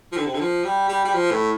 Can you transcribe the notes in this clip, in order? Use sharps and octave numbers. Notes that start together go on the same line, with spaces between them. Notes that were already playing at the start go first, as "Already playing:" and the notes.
F3
D3
C3
D3
F3
G3
G3
G3
F3
A2